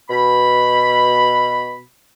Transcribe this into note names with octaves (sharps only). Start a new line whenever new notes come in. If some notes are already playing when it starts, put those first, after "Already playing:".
B2 B5